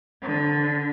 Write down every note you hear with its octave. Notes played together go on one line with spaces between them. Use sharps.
D3